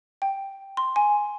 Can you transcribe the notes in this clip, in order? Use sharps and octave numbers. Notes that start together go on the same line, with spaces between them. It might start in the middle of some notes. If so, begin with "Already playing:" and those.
G5
C6
G#5